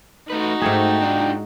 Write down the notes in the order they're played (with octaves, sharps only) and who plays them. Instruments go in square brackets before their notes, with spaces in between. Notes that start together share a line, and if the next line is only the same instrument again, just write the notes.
[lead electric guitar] A3 B4 [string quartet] D#4 F#4
[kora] G#2 G#4 [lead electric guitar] A3 [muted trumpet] G5
[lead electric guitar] D4 F4